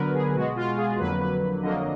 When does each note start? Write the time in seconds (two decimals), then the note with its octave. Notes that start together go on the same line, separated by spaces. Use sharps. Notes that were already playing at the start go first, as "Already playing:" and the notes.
Already playing: D3 F#3 B3 A#4 B4
0.14 G#4
0.35 B2 G#3 B3 F#4
0.56 F4
0.77 G#4
0.99 F2 D3 F#3 A#3 B4
1.20 B4
1.62 F2 D3 F#3 A#3 D#5